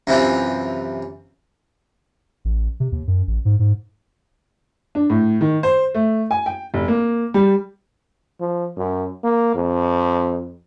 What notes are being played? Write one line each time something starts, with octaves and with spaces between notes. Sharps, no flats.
F#2 C3 E3 F3
A1
C3
D#2
F#2
A1
G#2
G#2
D4
A2
D#3
C5
A3
G#5
G5
F1
A#3
G3
F3
F#2
A#3
F2